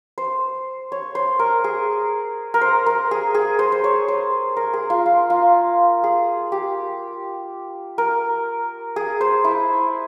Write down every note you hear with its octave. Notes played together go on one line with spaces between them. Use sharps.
C5
C#5
C5
A#4
G#4
A#4
C5
A#4
G#4
G#4
C5
C5
C#5
C5
A#4
G#4
F4
F4
F4
G#4
G4
A#4
G#4
C5
E4